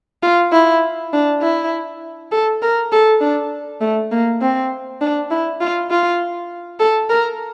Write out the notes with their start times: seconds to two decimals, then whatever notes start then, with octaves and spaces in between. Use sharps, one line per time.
0.23 F4
0.52 E4
1.13 D4
1.42 E4
2.32 A4
2.62 A#4
2.92 A4
3.21 D4
3.81 A3
4.11 A#3
4.41 C4
5.01 D4
5.31 E4
5.61 F4
5.90 F4
6.79 A4
7.10 A#4